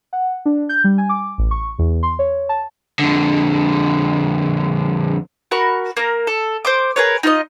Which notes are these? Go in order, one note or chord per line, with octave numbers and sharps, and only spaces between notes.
F#5
D4
G6
G3
G#5
D6
A1
C#6
E2
C6
C#5
A5
F2 D3
F#4 A#4 B5 C#6
A#3 A#4
A4
C5 C6 D6
G#4 A#4 B4 C#5
D#4 F4 C5 D#5